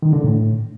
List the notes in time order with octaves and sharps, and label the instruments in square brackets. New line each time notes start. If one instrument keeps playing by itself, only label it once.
[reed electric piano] D#3
D3
A2